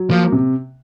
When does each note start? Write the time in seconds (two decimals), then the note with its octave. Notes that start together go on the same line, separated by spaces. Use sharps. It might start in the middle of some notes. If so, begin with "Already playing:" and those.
Already playing: F#3
0.10 F3 A#3
0.32 C3